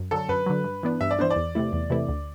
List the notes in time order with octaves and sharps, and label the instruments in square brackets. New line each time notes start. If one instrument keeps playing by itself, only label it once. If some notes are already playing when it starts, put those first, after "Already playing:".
Already playing: [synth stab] F#2
[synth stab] D3 F#3 [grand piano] A4
[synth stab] F#2 [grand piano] B4
[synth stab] D3 F#3
G2
E3 B3 D4
[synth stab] G2 [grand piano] E5
[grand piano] D5
[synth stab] E3 B3 D4 [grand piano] C5
[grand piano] D5
[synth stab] E2
C3 E3 A3 E4
E2
C3 E3 A3 E4
D2